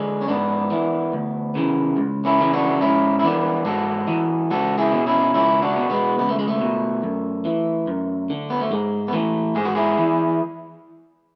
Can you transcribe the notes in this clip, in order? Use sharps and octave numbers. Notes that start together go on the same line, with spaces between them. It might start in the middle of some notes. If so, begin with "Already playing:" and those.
Already playing: D3 G#3
C#4
G#2 B3 D4
E3
D2
C#3 E3
C#2
C#4 E4
C#3 E3
D4 F#4
G#2 C#4 E4
E4
E3 B3 D4
G#2 F#4 A4
E3
C#2 F#4 A4
E4 G#4
B2
C#4 E4
C#2 C#4 E4
D4 F#4
B2
G#3 B3
C#2 B3
A3
G#3
A3
B2
F#2
E3
F#2
D3
B3
A3
G#2 G#3
B3
E3 A3
G#2 G#4
F#4
E4 G#4
E3